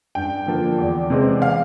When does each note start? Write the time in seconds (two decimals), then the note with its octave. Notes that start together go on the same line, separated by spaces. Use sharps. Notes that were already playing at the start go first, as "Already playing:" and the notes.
0.15 G2 G5
0.46 D3 F3 A#3
0.78 E2
1.10 C3 E3 G#3 C4
1.42 F5